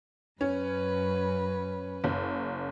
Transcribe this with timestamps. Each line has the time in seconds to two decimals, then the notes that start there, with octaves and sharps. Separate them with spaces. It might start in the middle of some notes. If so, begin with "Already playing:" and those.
0.41 F#2 C#4 B4
2.04 F#1